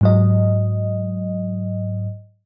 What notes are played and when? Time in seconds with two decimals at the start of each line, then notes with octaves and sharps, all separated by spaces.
0.01 G#2 F#3 D#5